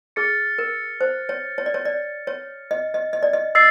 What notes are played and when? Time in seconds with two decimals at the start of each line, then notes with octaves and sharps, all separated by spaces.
0.16 G#4 F6 A6 C#7
0.58 A#4
1.01 C5
1.29 C#5
1.58 C#5
1.66 D5
1.74 C#5
1.85 D5
2.27 C#5
2.71 D#5
2.94 D#5
3.13 D#5
3.23 D5
3.33 D#5
3.55 D#5 E6 A6 C7